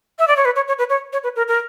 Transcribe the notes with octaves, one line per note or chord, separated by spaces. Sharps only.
E5
D5
C#5
B4
C#5
C#5
B4
C#5
C#5
B4
A#4
A#4